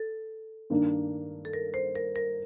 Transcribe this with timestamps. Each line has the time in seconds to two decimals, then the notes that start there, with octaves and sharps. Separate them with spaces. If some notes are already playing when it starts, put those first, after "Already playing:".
Already playing: A4
0.70 G2 D#3 A#3 D4
1.45 A4
1.53 A#4
1.74 C5
1.95 A#4
2.16 A#4